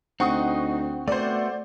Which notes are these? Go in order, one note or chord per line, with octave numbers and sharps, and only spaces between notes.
D2 C4 D#4 F#5 C#6 D#6
A3 B3 F#4 C5 D5